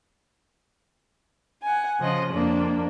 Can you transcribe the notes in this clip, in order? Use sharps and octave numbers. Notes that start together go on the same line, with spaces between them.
F#5 G#5
C#3 F3 D#5
F2 A#3 D4